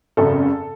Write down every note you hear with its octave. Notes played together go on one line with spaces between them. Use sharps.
G#1 F#2 C#3 A4